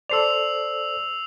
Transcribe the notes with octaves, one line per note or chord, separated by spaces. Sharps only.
A4 C5 D5 E6 C7 F7